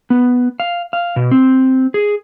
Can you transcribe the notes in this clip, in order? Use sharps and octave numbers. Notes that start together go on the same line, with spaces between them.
B3
F5
F5
B2
C4
G#4